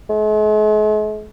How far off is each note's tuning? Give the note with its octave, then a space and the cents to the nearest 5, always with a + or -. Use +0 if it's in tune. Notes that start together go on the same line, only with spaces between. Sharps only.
G#3 +45